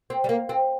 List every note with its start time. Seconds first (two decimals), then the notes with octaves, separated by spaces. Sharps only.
0.10 C4
0.24 G3
0.29 A#3
0.49 C4